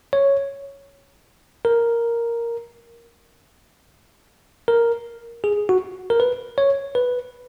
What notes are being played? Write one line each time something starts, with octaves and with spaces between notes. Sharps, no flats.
C#5
A#4
A#4
G#4
F#4
A#4
B4
C#5
B4